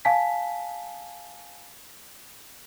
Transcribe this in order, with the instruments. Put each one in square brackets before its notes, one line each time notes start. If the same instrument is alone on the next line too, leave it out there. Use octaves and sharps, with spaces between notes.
[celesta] F5 G#5 A5 B6